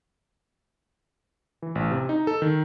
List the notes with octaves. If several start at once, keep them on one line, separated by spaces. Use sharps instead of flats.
E3
A1
C3
D#4
A4
D#3